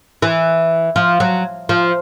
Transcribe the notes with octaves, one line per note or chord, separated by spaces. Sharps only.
E3
F3
F#3
F3